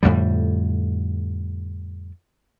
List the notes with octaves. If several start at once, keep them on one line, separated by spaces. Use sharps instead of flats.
F2 A2 D3 G3